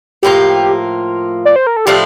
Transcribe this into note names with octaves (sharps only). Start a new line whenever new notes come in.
A2 F3 A#3 F4 G4
D5
C5
A#4
A4
A2 F3 A3 D4 G4